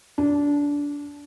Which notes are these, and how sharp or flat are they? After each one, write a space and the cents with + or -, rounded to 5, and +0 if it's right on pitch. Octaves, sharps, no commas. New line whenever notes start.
D4 -20